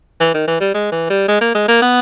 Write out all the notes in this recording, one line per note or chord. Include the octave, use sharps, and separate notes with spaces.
E3
D#3
E3
G3
G#3
E3
G3
G#3
A#3
G#3
A#3
B3